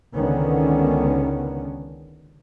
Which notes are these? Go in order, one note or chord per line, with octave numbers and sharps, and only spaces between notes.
C#2 D3 D#3 B3 C#4